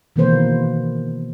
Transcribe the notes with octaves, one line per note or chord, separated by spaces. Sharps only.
B2 D#3 E3 A#3 B4 C5